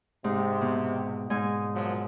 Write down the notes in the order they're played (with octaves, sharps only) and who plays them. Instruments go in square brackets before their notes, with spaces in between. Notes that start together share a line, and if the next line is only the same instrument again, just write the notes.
[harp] G#2 [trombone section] C3
[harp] B2
G#2 G#5
[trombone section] A#2 F3 F#3